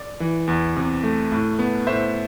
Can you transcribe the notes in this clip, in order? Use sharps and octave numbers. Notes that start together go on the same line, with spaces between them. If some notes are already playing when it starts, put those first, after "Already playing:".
Already playing: D5
E3
E2
C3
A3
A2
B3
A2 C5 E5